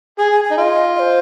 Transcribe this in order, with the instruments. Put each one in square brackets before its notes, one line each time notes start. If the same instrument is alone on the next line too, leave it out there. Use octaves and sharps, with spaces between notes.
[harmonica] G#4 [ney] G#5
[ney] G#5
G#5
[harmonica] D#4
[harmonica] F4 [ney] D#5
[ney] D#5
C5